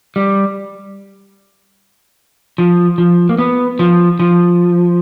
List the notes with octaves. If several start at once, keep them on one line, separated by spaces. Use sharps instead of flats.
G3
F3
F3
A#3
B3
F3
F3